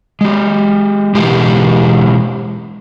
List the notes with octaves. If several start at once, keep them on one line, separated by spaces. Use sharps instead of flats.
G#3 G4
B2 D3 E3 G#3 G4